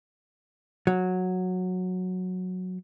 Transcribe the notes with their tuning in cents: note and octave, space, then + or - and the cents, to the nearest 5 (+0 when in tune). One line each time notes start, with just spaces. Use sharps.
F#3 -10